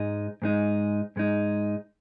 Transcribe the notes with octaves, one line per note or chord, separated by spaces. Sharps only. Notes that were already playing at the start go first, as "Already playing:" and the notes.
Already playing: G#2 G#3 D#4
G#2 G#3 D#4
G#2 G#3 D#4